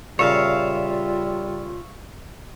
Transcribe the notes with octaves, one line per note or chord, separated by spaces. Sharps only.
A#2 C#3 G3 F4 C#5 E5 F5